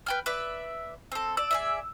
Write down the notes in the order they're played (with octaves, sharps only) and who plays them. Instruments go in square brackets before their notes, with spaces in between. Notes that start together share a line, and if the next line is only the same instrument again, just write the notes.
[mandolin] B4 G5 F6
B4 D5 E5
C4 A4
[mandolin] D5 [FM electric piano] E6
[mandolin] G#4 D5 E5